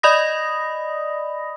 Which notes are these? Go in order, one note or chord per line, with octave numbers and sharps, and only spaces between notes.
D5 D#5 B5 D#6 A#6